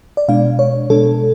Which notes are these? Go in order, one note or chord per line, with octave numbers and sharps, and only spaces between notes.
D5
B2 G#3 D4 F5
C#5
B2 G#3 D4 A4